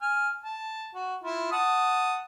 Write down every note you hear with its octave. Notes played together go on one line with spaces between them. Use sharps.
G#5 F6
A5
F#4
E4 F4
F#5 A5 D#6